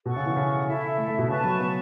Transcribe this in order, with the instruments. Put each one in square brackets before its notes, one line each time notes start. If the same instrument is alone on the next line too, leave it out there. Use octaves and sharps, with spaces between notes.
[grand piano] B2 [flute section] A4 F#5 C#6
[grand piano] C#3
E3
C#3
[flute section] E4 A4 E5
[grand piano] A3
A3
B2
[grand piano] C#3 [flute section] B4 A5 C#6
[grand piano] F#3
B3